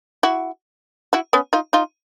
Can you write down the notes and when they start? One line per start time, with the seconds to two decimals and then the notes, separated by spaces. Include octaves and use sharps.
0.23 E4 F#4
1.13 E4 F#4
1.33 B3 C#4
1.53 D#4 F4
1.73 D#4 F4